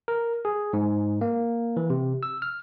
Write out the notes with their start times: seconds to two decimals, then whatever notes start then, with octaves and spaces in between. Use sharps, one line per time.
0.08 A#4
0.45 G#4
0.73 G#2
1.21 A#3
1.77 E3
1.90 C3
2.23 E6
2.42 F6